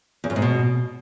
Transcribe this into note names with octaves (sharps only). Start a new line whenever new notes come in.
E2
F#2
G#2
B2